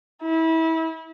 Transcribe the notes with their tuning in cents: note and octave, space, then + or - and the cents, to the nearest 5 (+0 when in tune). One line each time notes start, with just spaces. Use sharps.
E4 -30